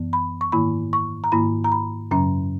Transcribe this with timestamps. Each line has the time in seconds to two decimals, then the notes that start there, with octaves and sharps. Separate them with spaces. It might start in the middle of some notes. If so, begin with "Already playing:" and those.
Already playing: F#2 E3 B3
0.13 B5
0.41 C#6
0.52 G#2 D#3 A#3 E4 B5
0.93 C#6
1.24 A#5
1.32 G#2 D#3 A#3 E4 B5
1.64 A#5
1.72 B5
2.11 F#2 C#3 F#3 C#4 A#5